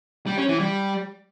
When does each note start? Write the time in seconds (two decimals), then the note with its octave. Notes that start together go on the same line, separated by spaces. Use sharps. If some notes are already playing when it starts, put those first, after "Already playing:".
0.26 G3
0.37 C#4
0.48 E3
0.60 G3